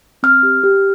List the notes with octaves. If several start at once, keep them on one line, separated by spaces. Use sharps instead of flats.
C4 F6
G4
G4